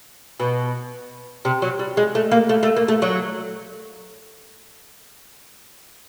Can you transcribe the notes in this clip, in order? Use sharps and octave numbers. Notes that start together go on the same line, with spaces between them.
B2
C3
F#3
G3
G#3
A3
A#3
A3
A3
A#3
A3
F#3